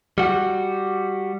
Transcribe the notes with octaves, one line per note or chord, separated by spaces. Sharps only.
G3 F#4